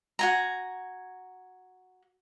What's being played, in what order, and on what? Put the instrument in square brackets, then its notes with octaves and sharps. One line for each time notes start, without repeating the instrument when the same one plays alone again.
[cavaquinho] F#4 G#5 A#5